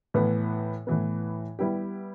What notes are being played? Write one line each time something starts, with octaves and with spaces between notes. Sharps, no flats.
A2 E3 B3
A2 E3 B3
G3 B3 E4 G4